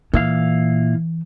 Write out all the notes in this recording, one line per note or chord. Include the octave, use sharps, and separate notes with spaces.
A#2 E3 E4 F5